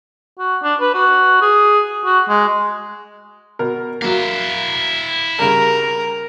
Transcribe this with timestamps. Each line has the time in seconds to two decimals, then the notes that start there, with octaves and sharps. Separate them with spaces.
0.39 F#4
0.63 D4
0.81 B4
0.94 F#4
1.42 G#4
2.05 F#4
2.29 G#3
3.59 B2 A#4
4.02 F#3 A#3 E4 F5
5.39 C#3 G3 A#4